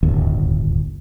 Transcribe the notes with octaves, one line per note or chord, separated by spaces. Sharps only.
D1 G1 D#2